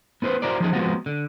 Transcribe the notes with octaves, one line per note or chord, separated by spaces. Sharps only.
B3 E4 B4 C5
E4 F#4 A#4 C5 D5
F3 D#4 G#4
F3 G#3 B3 C4 F4 F#4
D3